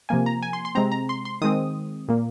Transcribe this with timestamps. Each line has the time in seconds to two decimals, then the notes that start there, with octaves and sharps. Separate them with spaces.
0.09 C3 F3 A#3 G#5
0.26 A#5
0.42 G#5
0.53 C6
0.65 C6
0.75 C3 G#3 C4 A#5
0.92 A#5
1.09 C6
1.25 C6
1.42 D#3 G#3 C4 D#6
2.08 A#2 A#3